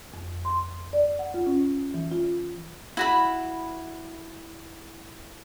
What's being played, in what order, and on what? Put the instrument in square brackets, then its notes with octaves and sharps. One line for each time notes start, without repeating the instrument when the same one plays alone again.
[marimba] F2
C6
D5
F#5
F4
C#4
E3
F4
[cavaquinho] E4 F#4 B5